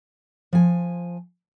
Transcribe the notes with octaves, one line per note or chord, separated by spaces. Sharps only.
F3 G#5